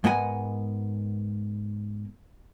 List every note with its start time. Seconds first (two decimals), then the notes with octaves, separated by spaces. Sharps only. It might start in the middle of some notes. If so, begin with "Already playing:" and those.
0.04 G#2 G#3 B3 A#4 F#5 G#5